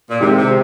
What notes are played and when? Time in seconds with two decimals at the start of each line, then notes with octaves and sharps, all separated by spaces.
0.10 A#2
0.20 G#1 G#2 C3 D#3 G#3
0.38 C3